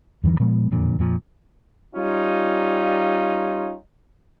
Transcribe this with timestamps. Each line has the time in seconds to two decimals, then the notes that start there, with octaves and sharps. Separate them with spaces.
0.24 E2 G2 D#3 E3
0.40 A#2 F3 G#3 B3
0.71 E1 F2 A#2 D3
0.99 F2 A#2 F3
1.96 G3 C#4 D#4 F4